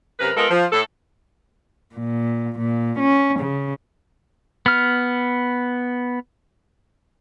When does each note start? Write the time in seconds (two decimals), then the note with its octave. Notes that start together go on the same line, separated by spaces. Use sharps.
0.19 F#2 C3 A#4 B4
0.36 G#3 B3 F4 A4 A#4
0.50 F3
0.72 A2 A4
1.95 A#2
2.59 A#2
2.99 C#4
3.40 C#3
4.66 B3 F6